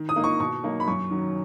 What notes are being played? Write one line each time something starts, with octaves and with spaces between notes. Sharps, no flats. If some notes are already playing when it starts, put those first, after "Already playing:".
Already playing: D#3
D#6
A#3 D#4
C#6
B2 C#6
F#3 A#3 D#4
B5
F#2 C#6
D#3 F#3 C#4